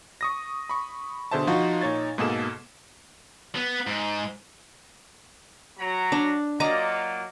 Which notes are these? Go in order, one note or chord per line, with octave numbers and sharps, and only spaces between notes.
C#6 D#6 A#6
B5 C#6
B2 D3 G#4 C5 E5 A5
F3 D#4 F4 F#4
A#2 D#4 C#5 G#6 A6
G#2 B2 A#3 G#4 A4 E7
B3
G#2
F#3 A#5
D4
F#3 A#3 F4 D5 D#5 A#5